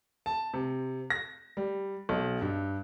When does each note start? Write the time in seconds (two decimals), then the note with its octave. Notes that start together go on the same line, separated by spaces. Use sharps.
0.26 A5
0.54 C3
1.10 A#6
1.57 G3
2.09 B1
2.41 G2